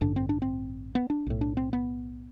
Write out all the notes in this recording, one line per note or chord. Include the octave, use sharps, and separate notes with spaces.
A1 G2 D3 D4
C4
D4
C4
B3
D4
B1 A2
D4
C4
B3